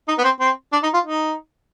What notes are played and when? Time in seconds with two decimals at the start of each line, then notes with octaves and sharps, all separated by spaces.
0.08 D#4
0.18 B3
0.24 C4
0.40 C4
0.72 D4
0.83 D#4
0.94 F4
1.04 D#4